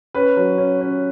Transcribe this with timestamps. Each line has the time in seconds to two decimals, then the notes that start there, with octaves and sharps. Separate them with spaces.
0.14 C#4 B4
0.37 F#3
0.58 C#4
0.81 C#4